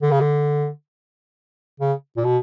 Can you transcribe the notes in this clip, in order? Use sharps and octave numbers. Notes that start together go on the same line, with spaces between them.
D3
C#3
D3
C#3
A#2
B2